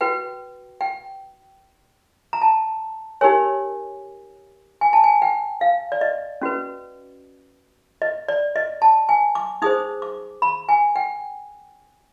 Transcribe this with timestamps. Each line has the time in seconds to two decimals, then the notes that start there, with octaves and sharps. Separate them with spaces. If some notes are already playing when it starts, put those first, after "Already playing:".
0.01 F#4 B4 G5
0.81 G5
2.33 A#5
2.42 A5
3.21 D#4 G4 A#4 C#5 G#5
4.81 G#5
4.93 A5
5.04 G#5
5.22 G5
5.61 F5
5.92 D5
6.01 D#5
6.42 C#4 F#4 B4
8.02 D#5
8.28 D5
8.56 D#5
8.82 A5
9.09 G#5
9.35 D6
9.62 D#4 G#4 C5 D#6
10.02 D6
10.42 B5
10.69 G#5
10.96 G5